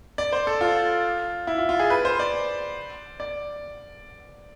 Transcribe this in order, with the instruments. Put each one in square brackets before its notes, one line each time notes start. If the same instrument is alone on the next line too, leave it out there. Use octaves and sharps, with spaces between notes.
[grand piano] D5
C5
A4
F4
E4
F4
F4
G#4
B4
C5
D5
D5